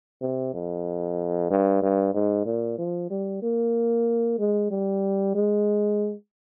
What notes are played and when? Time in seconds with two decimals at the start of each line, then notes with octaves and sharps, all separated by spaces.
0.22 C3
0.54 F2
1.50 G2
1.82 G2
2.14 G#2
2.46 A#2
2.78 F3
3.11 G3
3.42 A#3
4.39 G#3
4.71 G3
5.35 G#3